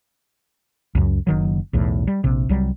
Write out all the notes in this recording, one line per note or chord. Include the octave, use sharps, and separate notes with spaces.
C#2 F#2
F#1 D#3 F#3
B1 E2 A2
G3
A#1 C3
C2 F#3 G3